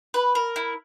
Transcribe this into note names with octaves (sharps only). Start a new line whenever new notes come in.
B4
A#4
E4